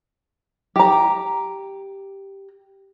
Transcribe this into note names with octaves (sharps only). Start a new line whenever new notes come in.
G4 A#5